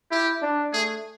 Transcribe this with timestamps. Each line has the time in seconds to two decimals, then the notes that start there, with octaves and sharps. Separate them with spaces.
0.11 E4 G4
0.42 D4
0.73 A3 G#4